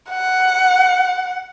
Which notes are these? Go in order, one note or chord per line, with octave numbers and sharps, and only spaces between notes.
F#5